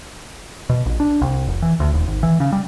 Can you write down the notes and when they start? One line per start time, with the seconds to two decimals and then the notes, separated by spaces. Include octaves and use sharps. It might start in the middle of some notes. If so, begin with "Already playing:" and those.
0.69 B2
0.86 A#1
1.00 D4
1.22 C2
1.47 F1
1.62 E3
1.80 D2
1.94 D#1
2.08 G#1
2.23 E3
2.40 C#3
2.52 G3